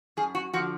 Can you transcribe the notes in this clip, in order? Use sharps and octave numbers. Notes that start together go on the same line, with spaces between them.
F#2 G#4
F#4
D3 F3 F#4